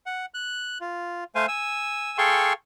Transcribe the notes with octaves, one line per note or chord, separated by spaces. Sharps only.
F#5
F#6
F4
A3 C5 F5 G#5
G#5 E6
G#4 A4 F5 G5 C6 C#6